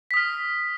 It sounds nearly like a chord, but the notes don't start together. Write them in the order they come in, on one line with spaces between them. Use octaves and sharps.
B6 D#6 F6